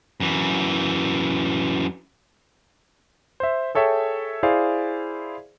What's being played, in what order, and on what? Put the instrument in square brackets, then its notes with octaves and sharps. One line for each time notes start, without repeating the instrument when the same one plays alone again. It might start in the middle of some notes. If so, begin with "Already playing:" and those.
[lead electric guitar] F#2 E3
[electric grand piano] C5 E5
G#4 A4 C#5 E5 G5
E4 G#4 C5 D5 F5